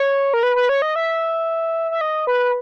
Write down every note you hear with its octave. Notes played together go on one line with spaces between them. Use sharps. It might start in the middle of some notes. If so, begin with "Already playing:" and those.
Already playing: C#5
A#4
B4
B4
C#5
D#5
E5
E5
D#5
B4